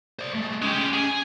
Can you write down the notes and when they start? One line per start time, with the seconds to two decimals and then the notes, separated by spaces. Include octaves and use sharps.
0.19 C5 D5
0.35 G#3 A3
0.62 G#3 C#4 G4
0.93 G#4 G#5